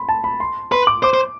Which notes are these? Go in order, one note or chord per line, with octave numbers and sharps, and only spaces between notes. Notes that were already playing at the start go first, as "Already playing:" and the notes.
Already playing: B5 C6
A5
B5
C6
B4 C6
D6
C5 D6
C5